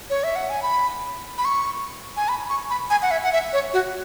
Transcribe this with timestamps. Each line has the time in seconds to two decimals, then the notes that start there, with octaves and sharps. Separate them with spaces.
0.10 C#5
0.24 E5
0.36 F#5
0.50 G#5
0.63 B5
1.38 B5
1.45 C#6
2.17 G#5
2.28 B5
2.49 C#6
2.70 B5
2.90 G#5
3.02 F#5
3.11 E5
3.23 F#5
3.32 E5
3.53 C#5
3.73 F#4